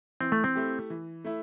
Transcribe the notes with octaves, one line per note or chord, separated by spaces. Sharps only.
E3 C4
A3
C4
A3 E4 G4
E3
A3 E4